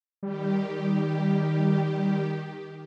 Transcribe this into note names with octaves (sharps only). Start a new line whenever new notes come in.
D#3 G3 G4